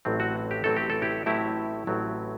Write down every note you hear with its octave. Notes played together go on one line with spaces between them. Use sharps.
A1 A2 F#3 C4
F#4
G4
A1 A2 F#3 C4 A4
G4
A4
E4 G4
A1 A2 F#3 C4 E4 G4
A1 A2 F#3 C4